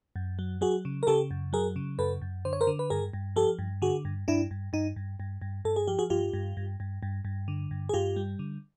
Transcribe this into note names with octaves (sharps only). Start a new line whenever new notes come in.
F#2
F#3
F#3 F#4 G#4
C#3
A#4
C#3 G4 A4
F#2
F#3 G#4 A#4
C#3
F#2 A4 B4
F#2
D3 C5
C#5
A#4 C5
D3
B4
G2 G#4 A#4
G2
F3 G4 A4
G2
D3 F#4 G#4
G2
G2 D4 E4
G2
G2 D#4
G2
G2
G2
G2 A4
G#4
F3 G4
F#4 G#4
G2 F4 G4
G2
G2
G2
G2
G2
D3
G2
G#4
G2 F4 G4
G3
D3